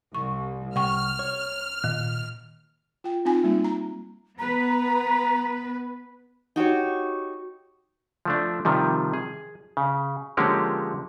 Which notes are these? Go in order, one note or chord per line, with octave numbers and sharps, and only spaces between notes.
C2 C#6
C2 F#5 G5 C#6 F6
C#5
A#2 D#3
F4 G5
C4 D#4 F4 G#5
G3 A#3 D#4
A#5
B3 B4 A#5
D#4 F#4 G4 C#5
F3 A3 D4
C3 D#3 F3 G3
G#4
C#3
D3 F3 G#3 A#3 C#4 G4